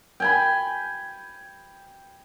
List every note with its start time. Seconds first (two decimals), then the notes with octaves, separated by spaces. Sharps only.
0.20 G5 G#5 B5